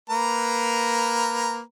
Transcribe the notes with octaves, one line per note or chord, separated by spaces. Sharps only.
A#3 B4 A#5